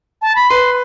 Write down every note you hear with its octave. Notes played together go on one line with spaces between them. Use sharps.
A5
B5
B4 C6